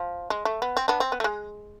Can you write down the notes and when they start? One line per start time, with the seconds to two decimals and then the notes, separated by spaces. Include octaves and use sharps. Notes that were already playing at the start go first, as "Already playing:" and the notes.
Already playing: F3
0.30 G#3
0.45 A3
0.62 B3
0.77 C4
0.88 B3 D4
1.00 C4
1.12 B3
1.20 A3
1.24 G#3